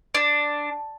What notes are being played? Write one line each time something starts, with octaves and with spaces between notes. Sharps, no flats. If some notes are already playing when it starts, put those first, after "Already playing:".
D4